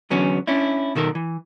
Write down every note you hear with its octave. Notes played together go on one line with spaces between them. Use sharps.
E2 D3 F#3 B3 C#4
C#4 D4 E4
B2 D#3 A4 A#4
E3